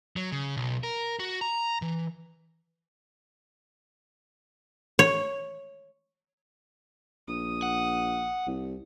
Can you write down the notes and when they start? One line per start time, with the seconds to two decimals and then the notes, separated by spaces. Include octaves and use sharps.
0.16 F#3
0.32 C#3
0.57 B1
0.83 A#4
1.20 F#4
1.41 A#5
1.82 E3
4.99 C#5
7.28 A#1 D#6
7.63 F#5
8.47 C2